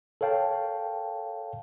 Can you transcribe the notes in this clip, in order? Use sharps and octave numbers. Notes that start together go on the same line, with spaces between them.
A4 A#4 C#5 F5 G5 A5